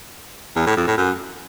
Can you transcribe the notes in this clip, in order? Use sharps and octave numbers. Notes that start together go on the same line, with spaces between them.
E2
A2
F2
A2
F#2